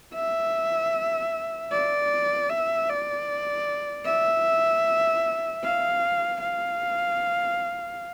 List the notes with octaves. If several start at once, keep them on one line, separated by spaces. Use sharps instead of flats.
E5
D5
E5
D5
E5
F5
F5